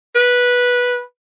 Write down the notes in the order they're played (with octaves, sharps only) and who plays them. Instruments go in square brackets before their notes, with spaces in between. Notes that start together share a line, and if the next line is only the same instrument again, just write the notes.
[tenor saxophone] B4